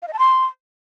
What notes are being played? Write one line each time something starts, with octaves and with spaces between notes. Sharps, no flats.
F5
D#5
A5
C6